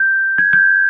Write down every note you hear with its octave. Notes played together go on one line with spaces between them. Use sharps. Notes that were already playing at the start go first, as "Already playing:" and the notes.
Already playing: G6
G#6
G6